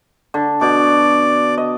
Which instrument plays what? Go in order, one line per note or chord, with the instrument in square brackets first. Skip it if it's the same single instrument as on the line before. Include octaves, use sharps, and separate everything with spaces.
[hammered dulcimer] D3
[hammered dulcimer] B2 [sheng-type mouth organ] D5
[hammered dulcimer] D#5